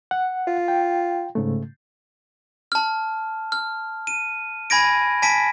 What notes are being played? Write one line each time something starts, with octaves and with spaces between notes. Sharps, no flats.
F#5
F4
G5
G#2 C#3 A3
A5 F6
F6
D#7
G#5 B5 G#6 A#6 D7
G#5 A5 B6 D7